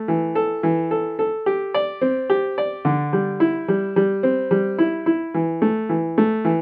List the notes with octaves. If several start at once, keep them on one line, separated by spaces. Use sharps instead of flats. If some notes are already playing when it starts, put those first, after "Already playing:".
Already playing: A3
E3
A4
E3
A4
A4
G4
D5
C4
G4
D5
D3
G3
E4
G3
G3
C4
G3
E4
E4
E3
A3
E3
A3
E3